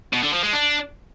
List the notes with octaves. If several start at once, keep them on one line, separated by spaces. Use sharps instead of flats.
B2
D3
F3
G#3
D4